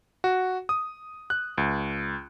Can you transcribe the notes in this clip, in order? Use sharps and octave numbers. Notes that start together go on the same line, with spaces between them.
F#4
D#6
F#6
C#2